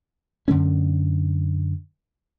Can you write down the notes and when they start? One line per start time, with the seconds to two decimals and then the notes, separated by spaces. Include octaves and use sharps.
0.48 F#2 D3 A3 C#4